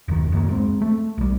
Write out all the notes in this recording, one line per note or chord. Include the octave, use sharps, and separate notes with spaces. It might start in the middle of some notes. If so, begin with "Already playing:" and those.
D#1 F#2 D#3
D1 F#2 A3 A#3
G#3 C4
A3
B1 G3